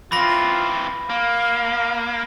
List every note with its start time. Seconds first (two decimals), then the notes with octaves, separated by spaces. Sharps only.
0.12 E3 C4 F4 B5 A#6
1.10 A#3 F5